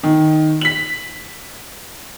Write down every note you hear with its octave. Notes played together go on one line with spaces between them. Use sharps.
D#3
B6 F#7